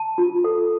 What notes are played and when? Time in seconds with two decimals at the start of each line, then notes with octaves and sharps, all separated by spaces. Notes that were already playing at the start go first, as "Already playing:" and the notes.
Already playing: A5
0.18 F4
0.44 A4